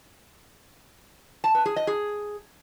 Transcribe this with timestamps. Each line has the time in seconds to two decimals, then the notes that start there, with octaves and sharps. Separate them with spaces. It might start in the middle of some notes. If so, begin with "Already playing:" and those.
1.44 A5
1.55 B4
1.66 G#4
1.76 D#5
1.87 G#4